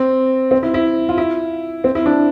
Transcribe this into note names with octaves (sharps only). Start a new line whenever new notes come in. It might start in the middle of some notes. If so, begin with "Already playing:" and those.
Already playing: C4
C4
E4
E4
F4
E4
C4
E4
D4